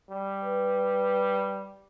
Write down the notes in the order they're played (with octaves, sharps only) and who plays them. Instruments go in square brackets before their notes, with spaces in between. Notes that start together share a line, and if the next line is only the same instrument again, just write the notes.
[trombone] G3
[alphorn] B4